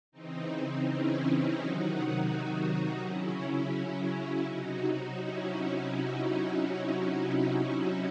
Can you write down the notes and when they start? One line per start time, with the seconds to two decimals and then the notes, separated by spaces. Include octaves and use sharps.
0.12 C#3 E3 C4 D#4
0.84 C#4 E4
1.20 C#4 E4
1.56 C3 D#3 F#3 D#4 F#4
3.01 C#3 F#3 C#4 E4
4.45 C3 F#3 D#4 F#4
5.17 C#4 E4